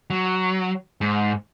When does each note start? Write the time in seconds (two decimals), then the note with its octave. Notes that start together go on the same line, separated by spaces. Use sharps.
0.10 F#3
1.01 G#2